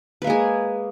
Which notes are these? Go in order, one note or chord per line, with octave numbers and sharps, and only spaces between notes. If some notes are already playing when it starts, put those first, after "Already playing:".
G#3 A#3 G#4 B4